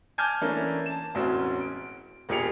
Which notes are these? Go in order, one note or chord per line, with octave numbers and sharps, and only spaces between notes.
G#5 A5 D6 F6 G6 G#6
E3 A3 A#3 C#4 D4
A5 E7
E1 A1 C4 C#4 F#4 C5
D7
E1 A#2 G4 G#4 C#7 F7